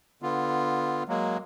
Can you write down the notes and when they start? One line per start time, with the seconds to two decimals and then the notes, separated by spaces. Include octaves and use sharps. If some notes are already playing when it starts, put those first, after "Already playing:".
0.22 D3 B3 F4
1.09 F#3 G#3 A#3